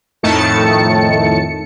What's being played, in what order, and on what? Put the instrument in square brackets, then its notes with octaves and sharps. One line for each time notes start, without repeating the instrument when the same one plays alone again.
[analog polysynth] F2 A2 D#3 A3 A5 C#7